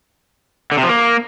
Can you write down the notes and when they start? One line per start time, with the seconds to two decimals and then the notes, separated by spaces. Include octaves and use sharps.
0.72 D3
0.77 C3
0.83 F3
0.89 A#3